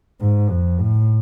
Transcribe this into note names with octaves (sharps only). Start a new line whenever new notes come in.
G#2
F2
A2